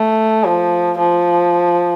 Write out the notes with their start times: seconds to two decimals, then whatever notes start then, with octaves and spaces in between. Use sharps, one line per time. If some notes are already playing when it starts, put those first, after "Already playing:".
Already playing: A3
0.44 F3
0.98 F3